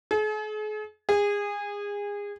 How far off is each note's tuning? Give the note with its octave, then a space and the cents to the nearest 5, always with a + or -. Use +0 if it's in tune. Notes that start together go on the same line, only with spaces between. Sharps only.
G#4 +45
G#4 -25